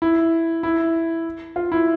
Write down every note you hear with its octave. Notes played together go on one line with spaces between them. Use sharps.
E4
E4
F4
E4